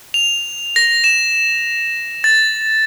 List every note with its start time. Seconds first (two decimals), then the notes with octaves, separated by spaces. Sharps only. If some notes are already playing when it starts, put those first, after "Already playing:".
0.14 F7
0.76 A#6
1.04 E7
2.24 A6